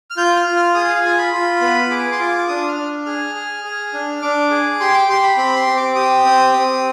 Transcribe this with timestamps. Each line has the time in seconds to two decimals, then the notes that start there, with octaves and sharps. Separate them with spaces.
0.11 F6
0.17 F4 G6
0.36 F6
0.46 F4
0.56 F6
0.74 G#4 D#6
0.89 F5
1.03 F4 G#5
1.18 B5
1.33 F4
1.61 B3
1.91 G#4 D6
2.12 C6
2.19 F4 D6
2.38 D6
2.48 D4 D#6
2.68 F6
2.77 D4
3.06 G#4 F6
3.35 G#4
3.64 G#4
3.93 D4
4.22 D4 D6
4.50 G#4
4.80 G4 C6
4.94 D6
5.08 G4 C6
5.23 B5
5.37 C4 B5
5.56 C6
5.67 C4
5.76 D6
5.95 G4 D#6
6.25 C4
6.53 C4